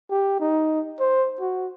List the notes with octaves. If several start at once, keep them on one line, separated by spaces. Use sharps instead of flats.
G4
D#4
C5
F#4